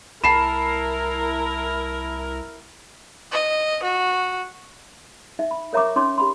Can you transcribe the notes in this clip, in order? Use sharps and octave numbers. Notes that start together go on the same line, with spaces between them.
C2 E4 A#4 A5 B5 C7 E7
D#5
F#4
D#4 E5
B5
A#4 C#5 E5 A#5 C#6 D6
C#4 D#4 C#5 C6 D6
G4 B5 C6